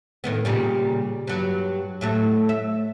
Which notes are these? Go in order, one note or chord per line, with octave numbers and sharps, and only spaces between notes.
A2 D#3 B3
A#2 C#3 G3
G2 F#3
A2 F#3 A3
E5